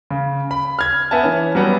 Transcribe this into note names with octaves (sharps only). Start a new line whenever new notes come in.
C#3
B5
F6 G#6
B3 E5 G#5 A5
E3 C#4
F#3 G3 B3 C#4